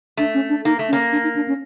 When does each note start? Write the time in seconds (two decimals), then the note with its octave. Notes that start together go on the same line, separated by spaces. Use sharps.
0.17 A3 D4
0.34 C#4
0.49 D4
0.65 A#3 D#4
0.79 A3
0.88 C#4
0.93 A#3
1.12 D4
1.24 D#4
1.36 D4
1.48 C#4